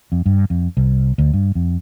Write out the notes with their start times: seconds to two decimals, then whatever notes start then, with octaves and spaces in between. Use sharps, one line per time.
0.12 F2
0.26 G2
0.50 F2
0.77 C2
1.18 D2
1.33 G2
1.55 F2